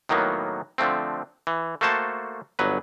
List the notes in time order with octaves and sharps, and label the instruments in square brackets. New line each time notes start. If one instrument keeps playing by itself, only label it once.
[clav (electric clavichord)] A2 D#3 F#3 A#3 B3
D3 F3 A3 C4
E3
A3 A#3 F#4 C5 A5
G1 F#3 B4